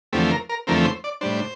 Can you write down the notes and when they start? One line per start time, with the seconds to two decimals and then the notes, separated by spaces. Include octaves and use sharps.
0.13 E2 D3 F3 A3 C4 G4
0.31 A#4
0.49 A#4
0.67 E2 D3 F3 A3 C4 A#4
0.85 C5
1.04 D5
1.21 A2 G3 D4 C5